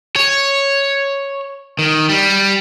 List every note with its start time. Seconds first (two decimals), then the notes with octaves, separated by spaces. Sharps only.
0.16 C#5
1.79 D#3
2.09 G3